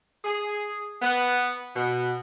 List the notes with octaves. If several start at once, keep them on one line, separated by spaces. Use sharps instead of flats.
G#4
B3
B2